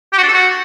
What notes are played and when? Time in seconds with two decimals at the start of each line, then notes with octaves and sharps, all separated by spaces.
0.13 G4
0.18 F#4
0.23 D4
0.28 A4
0.33 F#4